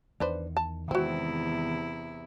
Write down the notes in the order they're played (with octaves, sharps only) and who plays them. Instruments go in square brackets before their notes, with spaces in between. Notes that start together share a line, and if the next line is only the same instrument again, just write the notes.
[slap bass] E2 D#3 [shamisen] D4 B4 C5
[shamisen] A5
[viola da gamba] E2 C3 E4 [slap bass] D#3 G#3 B3 [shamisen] C4 F#4